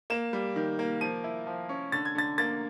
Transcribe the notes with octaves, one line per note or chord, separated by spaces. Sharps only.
A#3 E7
G3
D#3
A#3
F3 D#7
E4
F3
C#4
D3 A6
G#6
D3 A6
A#3 A6